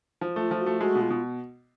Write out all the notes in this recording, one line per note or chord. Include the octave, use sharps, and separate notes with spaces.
F3
A3 F4
F3
F#4
A3
G#3 F#4
B2
F4
B2